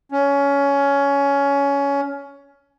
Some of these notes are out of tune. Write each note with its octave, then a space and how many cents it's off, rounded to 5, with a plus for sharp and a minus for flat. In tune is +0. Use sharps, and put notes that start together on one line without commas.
C#4 +20